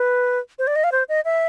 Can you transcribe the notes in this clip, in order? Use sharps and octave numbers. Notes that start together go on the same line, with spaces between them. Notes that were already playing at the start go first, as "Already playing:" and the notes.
Already playing: B4
C5
D5
D#5
F5
C5
D#5
E5